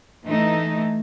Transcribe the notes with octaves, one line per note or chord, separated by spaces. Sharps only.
E3 A3 D#4